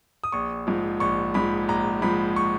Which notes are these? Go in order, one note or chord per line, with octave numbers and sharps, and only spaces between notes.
D#6
A#1 C#6
G#2 F3
A#1 C#6
G#2 F3 B5
A#1 A#5
G#2 F3 B5
C#6